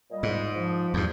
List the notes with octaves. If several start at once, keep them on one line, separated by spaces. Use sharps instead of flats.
A#2 G3 D#5
G#2
F3
E2 G2